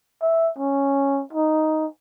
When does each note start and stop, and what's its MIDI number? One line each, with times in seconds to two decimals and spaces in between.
0.22 0.50 76
0.58 1.23 61
1.33 1.87 63